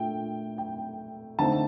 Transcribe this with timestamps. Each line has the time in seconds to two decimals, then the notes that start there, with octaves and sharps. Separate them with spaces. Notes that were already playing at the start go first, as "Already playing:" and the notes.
Already playing: A#2 A3 D4 G5
0.58 G5
1.39 D3 A3 C4 D#4 A5